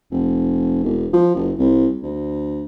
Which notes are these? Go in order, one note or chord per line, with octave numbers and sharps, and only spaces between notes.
F1
E1
F3
F#1
C2
D2